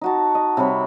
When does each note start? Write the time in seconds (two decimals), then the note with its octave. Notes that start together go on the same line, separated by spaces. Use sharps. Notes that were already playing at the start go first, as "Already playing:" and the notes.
0.01 D#4 F#4 A5
0.35 D#5
0.57 C3 G3 C#5 B5